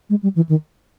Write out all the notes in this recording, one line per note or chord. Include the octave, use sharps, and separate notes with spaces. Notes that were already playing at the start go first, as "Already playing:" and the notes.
G#3
G3
E3
D#3